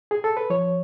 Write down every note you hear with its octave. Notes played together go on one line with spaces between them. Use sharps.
G#4
A4
B4
F3 C#5